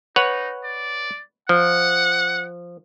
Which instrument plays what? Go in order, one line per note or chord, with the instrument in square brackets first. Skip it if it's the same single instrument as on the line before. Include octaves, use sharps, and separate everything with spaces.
[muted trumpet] D#4 [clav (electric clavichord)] B4 C#5 F#5
[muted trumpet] D5
[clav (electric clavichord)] F3 [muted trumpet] F#5